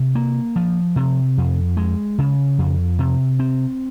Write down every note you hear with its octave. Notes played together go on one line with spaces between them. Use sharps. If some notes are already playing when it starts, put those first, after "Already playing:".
Already playing: C3
A#3
F3
C3
F2
G#3
C#3
F2
C3
C4